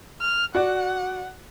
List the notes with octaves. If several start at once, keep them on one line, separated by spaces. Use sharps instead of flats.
F6
F#4 D5 F#5